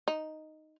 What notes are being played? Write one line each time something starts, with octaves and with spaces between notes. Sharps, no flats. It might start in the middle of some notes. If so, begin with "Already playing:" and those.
D#4